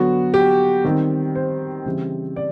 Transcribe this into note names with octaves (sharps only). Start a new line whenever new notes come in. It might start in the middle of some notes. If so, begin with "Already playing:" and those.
Already playing: D3 F#3 B3 F#4
G4
D#3 G3 C4
C5
C#3 E3 G3 C4
D5